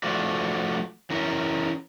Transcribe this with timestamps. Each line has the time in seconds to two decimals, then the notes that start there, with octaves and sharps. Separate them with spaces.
0.03 F3 A3 F4 F#4 D5
1.10 E3 C#4 A#4